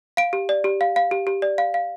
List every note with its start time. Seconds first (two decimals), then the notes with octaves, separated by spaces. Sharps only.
0.17 F5 D7
0.33 G4
0.49 D5
0.64 G4
0.81 F5
0.96 F5
1.11 G4
1.27 G4
1.42 D5
1.58 F5
1.74 F5